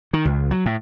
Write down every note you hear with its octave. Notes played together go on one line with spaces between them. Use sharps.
D#3
C#2
F#3
A2